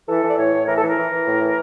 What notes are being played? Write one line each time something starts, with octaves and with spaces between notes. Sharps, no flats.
E3 A4
E3
D5
A2 C#5
A2
E3 A#4
A4
E3
A#4
E3
E3
A2
E3